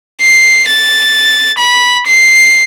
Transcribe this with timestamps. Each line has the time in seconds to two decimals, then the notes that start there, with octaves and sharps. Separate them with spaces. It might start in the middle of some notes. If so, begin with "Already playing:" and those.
0.21 C7
0.68 A6
1.58 B5
2.07 C7